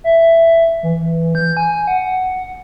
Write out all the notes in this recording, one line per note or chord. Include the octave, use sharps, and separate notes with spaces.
E5
E3
G6
G#5
F#5